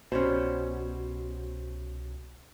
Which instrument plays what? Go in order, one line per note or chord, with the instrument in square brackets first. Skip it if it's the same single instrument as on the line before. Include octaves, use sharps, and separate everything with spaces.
[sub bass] C2 [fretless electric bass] B2 [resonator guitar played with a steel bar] F#3 G3 C#4 [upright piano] C5